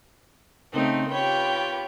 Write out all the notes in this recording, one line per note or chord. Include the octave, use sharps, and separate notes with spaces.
C#3 A3 C4 D#4
F4 G4 B4 C#5 G5